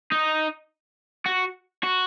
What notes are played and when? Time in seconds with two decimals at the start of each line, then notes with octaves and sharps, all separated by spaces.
0.12 D#4
1.26 F#4
1.83 F#4